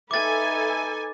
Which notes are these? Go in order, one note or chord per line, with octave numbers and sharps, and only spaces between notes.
D#4 A4 B4 E5 G#5 D6 A6